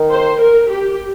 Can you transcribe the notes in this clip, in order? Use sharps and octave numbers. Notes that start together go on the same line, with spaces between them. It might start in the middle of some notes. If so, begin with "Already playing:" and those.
Already playing: D#3
C5
A#4
G4